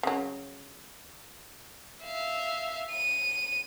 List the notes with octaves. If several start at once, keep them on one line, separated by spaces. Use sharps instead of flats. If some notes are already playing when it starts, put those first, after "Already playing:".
C#3 F#3
E5 F5
D#7